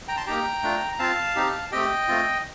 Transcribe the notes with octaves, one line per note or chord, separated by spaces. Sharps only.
G5 A#5
A5 C6
A#3 D#4 G4 G5 A#5
A3 D4 F4
A#5
C4 F4 F5 A5
C4 D#4 G4
A3 C4 G4 D#5 G5
A3 C4 F4